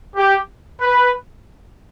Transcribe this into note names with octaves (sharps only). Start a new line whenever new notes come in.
G4
B4